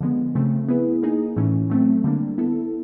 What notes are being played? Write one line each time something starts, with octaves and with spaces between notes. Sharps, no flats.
D3 F3 G#3 B3
C#3 F3 A3 C4
B3 E4 G#4 B4
A#3 D#4 G#4
A2 E3 A3 C#4
F#3 A3 C4
D3 G3 A#3 D4
B3 E4 A4